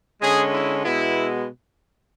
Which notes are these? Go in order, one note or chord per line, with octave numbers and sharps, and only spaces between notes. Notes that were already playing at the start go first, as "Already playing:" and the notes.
D3 G#3 C#4 G#4
E4
B2 G#3 B3 E4